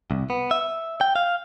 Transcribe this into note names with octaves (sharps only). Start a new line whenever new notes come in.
C2
B3
E5
G5
F5